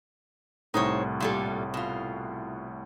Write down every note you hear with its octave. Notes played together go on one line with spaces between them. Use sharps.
C2 A2 D#4 C5 C#5
A#2 G3 A4
B2 F4